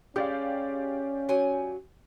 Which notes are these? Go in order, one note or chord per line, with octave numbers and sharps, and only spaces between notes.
G#3 C#4 G4 D5 F5
F#3 G#5